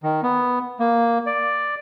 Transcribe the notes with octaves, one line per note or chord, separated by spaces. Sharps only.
D#3
B3
A#3
D5